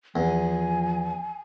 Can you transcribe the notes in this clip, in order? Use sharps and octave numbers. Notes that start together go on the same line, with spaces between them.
E2 F3 G#5